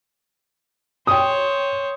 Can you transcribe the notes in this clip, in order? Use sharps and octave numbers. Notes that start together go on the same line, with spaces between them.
C5 C#5 G5 D#6